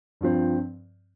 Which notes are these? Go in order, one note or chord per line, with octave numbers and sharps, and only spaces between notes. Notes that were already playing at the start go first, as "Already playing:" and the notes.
G2 F3 C4